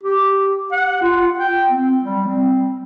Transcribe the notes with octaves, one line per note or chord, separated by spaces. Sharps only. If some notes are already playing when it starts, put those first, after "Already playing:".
G4
F#5
F4
G5
C4
G3
C4